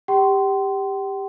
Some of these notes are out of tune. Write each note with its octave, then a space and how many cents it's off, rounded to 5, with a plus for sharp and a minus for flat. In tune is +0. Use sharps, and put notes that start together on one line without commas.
G4 +15 G5 -40 C6 -10